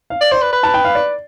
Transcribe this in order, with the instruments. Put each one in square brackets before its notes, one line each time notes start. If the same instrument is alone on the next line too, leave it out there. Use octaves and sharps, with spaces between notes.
[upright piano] F5
[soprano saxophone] D5
[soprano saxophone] C5 [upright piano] D5
[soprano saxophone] B4
B4
[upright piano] A5
G5
F5
D5